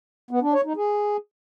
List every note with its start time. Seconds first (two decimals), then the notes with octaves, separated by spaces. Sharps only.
0.31 B3
0.42 D4
0.54 C#5
0.65 D#4
0.76 G#4